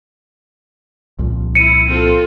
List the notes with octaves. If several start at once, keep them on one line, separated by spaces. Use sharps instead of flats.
C2 A#2 F3
E4 C#7 D#7
C4 F4 A4